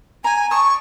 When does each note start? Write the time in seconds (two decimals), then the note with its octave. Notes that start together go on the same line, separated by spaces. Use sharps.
0.24 G#5 A#5
0.51 D5 A5 C#6 D#6